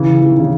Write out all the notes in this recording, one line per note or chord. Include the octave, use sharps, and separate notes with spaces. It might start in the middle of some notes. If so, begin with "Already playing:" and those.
Already playing: C#3 E3
E3
D#3
C#3 E3